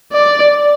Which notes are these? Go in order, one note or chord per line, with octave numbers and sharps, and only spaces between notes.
D5